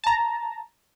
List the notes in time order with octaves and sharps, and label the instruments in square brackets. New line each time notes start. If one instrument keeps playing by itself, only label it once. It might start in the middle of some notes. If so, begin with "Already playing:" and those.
[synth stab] A5 A#5